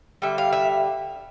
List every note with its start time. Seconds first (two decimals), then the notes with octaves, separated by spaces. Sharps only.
0.22 D3 G3 E5
0.38 F5
0.53 E5